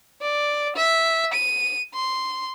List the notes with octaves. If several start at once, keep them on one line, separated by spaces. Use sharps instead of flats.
D5
E5
D#7
C6